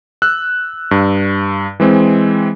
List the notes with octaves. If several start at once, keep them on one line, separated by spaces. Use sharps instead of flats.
E6 F#6
G2
E3 G#3 C4